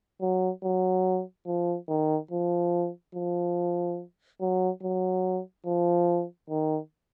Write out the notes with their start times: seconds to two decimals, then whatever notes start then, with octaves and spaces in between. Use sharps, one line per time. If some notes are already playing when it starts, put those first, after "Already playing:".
0.21 F#3
0.64 F#3
1.47 F3
1.88 D#3
2.31 F3
3.15 F3
4.41 F#3
4.82 F#3
5.66 F3
6.50 D#3